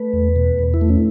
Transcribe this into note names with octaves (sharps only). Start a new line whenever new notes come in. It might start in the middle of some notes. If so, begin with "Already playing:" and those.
Already playing: A3 B4
E2
B2
E2
E4
A3
C#4